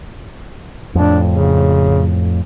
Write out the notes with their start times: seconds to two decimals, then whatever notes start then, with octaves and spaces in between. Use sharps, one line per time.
0.95 F2 A2 D4
1.29 C#3